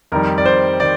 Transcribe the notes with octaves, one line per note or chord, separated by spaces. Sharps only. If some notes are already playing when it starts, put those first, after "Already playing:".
F2 D#3 G3 A#4
D5
C5
D#3 D5